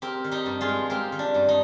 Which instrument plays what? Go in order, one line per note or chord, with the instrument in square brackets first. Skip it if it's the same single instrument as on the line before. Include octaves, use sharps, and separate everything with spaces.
[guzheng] C4 G4 A#4
D#3
D#4 G4
G2
F4 G#4
G#3
C4 G4 A#4
D#3
D4
G2
D#4